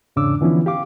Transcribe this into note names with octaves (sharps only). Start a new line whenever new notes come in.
E2 G#2 C#3 D4 D6 E6
D3 E3 F3 B3 C#4 E4
G4 F5 D6